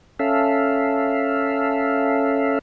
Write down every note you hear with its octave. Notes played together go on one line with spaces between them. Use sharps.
C#4 A4 E5 F5